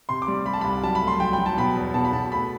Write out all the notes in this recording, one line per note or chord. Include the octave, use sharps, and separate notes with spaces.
C3 C6
D6
G3
G3 B5
A5
C2 B5
F#3 A5
B5
A3
C6
F#3 G5
G5
F#3
A5
B2 B5
E2
B2 A5
B5
B2 A5
A3 B5